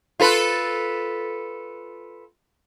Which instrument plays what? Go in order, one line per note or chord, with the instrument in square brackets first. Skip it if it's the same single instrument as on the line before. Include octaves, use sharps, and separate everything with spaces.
[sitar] F4 A4 B4